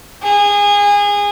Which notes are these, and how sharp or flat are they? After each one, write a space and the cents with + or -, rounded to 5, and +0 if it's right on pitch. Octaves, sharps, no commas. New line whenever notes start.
G#4 -25